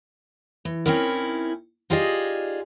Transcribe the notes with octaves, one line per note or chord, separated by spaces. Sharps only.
E3
C4 C#4 D#4 E4 A#4
D#4 F4 G4 G#4 D5 D#5